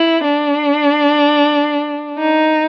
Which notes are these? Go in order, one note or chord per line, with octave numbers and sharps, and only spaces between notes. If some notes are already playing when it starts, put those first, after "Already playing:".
Already playing: E4
D4
D#4